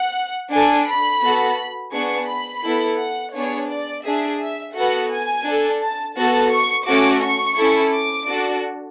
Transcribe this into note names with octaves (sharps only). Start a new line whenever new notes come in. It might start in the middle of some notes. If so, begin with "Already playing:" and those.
Already playing: F#5
D4 A4 G#5
B5
B3 F#4 A4
B3 D4 G#4 C#6
B5
B3 E4 A4
F#5
B3 D4 G#4 C#5
D5
D4 G#4 E5
E5
B3 F#4 A4 F#5
G#5
D4 A4
A5
B3 F#4 A4 A5
C#6
A3 C#4 F#4 A4 D6
C#6
C#4 E4 A4
D6
D4 F#4 A4